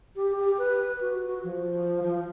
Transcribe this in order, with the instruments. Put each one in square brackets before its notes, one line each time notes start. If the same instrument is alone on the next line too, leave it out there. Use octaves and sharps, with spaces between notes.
[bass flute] G4
G4
B4
F#4
F#4
F3
F3